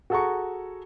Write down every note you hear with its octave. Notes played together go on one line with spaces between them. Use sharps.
F#4 G#4 A4 F#5 A#5 C#6